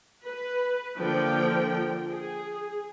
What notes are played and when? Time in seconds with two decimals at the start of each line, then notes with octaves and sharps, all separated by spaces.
0.23 B4
0.98 D3 F3 A#3 G5
2.09 G#4